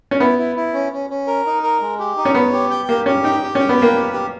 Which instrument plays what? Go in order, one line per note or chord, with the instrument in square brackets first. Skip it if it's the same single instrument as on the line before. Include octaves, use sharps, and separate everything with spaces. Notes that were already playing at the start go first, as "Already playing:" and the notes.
[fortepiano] C#4
[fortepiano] B3 [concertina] E4
[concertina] E4
E4
C#4
C#4
C#4
A#4
D#4
A#4
G#3
G4
D#4
[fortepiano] C#4
[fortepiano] B3 [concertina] C#5
[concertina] G4
G5
[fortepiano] A#3 [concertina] G4
[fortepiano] C#4 [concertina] G4
[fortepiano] D#4 [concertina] G5
[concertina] G4
[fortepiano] C#4
[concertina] G5
[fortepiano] B3
[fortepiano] A#3 [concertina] B4
[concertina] G4
G4